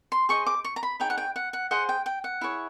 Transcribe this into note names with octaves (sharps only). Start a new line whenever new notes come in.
C6
G#4 C5 D#5 C#6
D6
C#6
A#5
B5
D#4 G#4 C#5 G5
F#5
G5
F#5
F#5
G#4 C5 D#5 F#5
G5
G5
F#5
E4 G#4 C#5